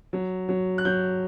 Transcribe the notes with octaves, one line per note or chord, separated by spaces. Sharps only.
F#3
F#3
F#6
F#3 G6